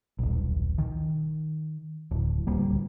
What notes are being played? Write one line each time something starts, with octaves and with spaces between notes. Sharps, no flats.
D#1 B1
D#3
D1
D1 C#2 G3 A#3